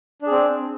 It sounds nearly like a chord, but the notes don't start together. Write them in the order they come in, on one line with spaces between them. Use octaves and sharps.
D4 G#4 C4